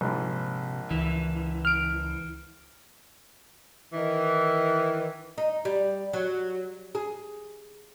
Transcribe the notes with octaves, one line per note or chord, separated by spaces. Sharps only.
A#1 G#2 C3
C#2 E3
F6 D7
D#3 E3
D#4
G3
F#3
G#4